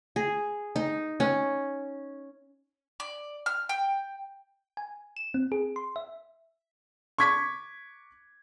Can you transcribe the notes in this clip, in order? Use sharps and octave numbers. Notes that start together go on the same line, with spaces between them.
G#4
D#4
C#4
D5
F6
G5
G#5
E7
C4
G#4
C6
E5
C#6 D6 G#6 B6